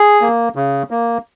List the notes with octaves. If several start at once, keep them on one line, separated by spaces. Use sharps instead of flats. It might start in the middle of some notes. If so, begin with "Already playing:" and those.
Already playing: G#4
A#3
C#3
A#3